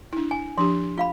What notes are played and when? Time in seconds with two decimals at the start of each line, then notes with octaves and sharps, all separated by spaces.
0.13 D4 E4
0.31 G#5
0.58 F3 D4 G4 C6
0.98 F4 F5 B5